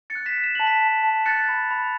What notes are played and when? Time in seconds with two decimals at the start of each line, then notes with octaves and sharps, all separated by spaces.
0.10 A6 C#7
0.15 F#6
0.26 B6 E7
0.38 F#6
0.44 E7
0.55 A5 F#7
0.67 B6 E7
0.81 A5
1.03 A5
1.26 F#6 A6 C#7
1.49 B5
1.71 B5